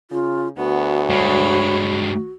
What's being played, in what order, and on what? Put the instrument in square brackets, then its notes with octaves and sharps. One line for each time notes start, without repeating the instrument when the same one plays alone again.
[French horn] C#3 [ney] F4
[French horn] D2 [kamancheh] B3 [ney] F#4
[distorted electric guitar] G2 G#3 [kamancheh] C#5 B5